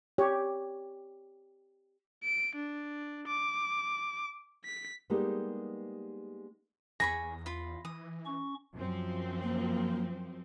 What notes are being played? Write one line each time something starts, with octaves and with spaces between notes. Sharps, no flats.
G4 C#5
D7
D4
D6
B6
G3 G#3 A#3 B3 D#4 G4
E2 G#4 B5 C#6 A#6
F4 B5
E3 D#6
C#4 C#6
F#2 F3 C4
A#3